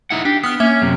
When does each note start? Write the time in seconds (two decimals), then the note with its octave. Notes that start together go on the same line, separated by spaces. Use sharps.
0.10 D#4 E4 F#5
0.25 D4 G4
0.43 B3 D#6 F6
0.60 A#3 C#4 E5
0.82 F#2 C3